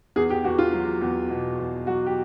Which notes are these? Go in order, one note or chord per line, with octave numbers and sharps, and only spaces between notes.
E2 G#4
G4
E2 F#4
F4
F#3
E2
B2
E2
F#3 F#4
G4